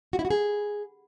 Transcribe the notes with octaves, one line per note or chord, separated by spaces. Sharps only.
F#4
E4
F#4
G#4